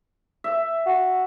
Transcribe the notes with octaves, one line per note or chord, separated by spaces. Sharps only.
E5
F#4